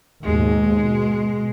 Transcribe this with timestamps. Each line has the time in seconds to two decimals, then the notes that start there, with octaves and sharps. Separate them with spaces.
0.24 D#2 G#2 B2 G#3
0.78 B2